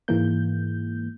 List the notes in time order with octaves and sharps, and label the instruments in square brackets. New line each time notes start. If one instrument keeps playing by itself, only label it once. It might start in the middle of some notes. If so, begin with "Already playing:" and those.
[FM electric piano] G#2 E3 G#3 A#3 G6